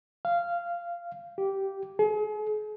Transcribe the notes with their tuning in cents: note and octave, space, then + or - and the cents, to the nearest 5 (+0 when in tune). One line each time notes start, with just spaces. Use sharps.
F5 -15
G4 -10
G#4 +40